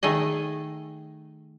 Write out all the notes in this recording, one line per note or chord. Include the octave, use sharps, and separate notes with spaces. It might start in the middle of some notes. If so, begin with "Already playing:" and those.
D#3 A3 G#4 D#5